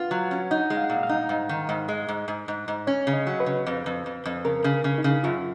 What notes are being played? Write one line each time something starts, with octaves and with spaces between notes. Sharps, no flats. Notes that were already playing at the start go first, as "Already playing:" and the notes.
Already playing: F4 B4 F5 F#5
F#3
C#4
D#4 F#5
G#3
F5
F#5
A#2 F5
F5
D#4
G#2
D#3
G#2
G#3
G#2
G#2
G#2
G#2
C#4 C#5
C#3
D#5
F#3
B4
C#3
F2
F2
F2
F2
C#3 A#4
C#3
C#3
D#4
C#3
F#2 F4